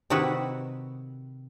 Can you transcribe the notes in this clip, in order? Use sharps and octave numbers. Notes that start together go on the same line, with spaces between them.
C3 D#3 E4 F#4 B4